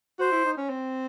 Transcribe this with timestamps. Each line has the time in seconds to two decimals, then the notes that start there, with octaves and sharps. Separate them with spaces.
0.19 F#4 C5
0.32 E4
0.45 D#4
0.58 C#4
0.69 C4